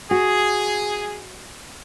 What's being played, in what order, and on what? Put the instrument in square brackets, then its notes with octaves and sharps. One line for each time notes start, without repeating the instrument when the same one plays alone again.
[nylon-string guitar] F#4 [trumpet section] G#4